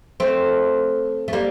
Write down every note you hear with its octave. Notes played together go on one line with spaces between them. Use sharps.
A3 C4
A3
G3 A#3